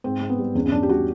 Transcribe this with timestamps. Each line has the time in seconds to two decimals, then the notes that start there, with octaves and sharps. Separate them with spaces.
0.04 G#2 C4
0.21 G#2
0.29 B3
0.38 G3
0.55 E2 C#4
0.66 C#4
0.72 E2 D4
0.83 G4
0.89 G3 F#4